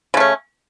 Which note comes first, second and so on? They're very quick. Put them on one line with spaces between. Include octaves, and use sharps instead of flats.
C#3 A3 C#4